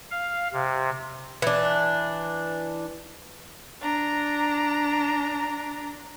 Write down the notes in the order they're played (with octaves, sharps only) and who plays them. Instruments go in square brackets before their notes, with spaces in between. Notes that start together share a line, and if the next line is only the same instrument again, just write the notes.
[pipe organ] F5
C3
[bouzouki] E3 D4
[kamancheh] D4 A#5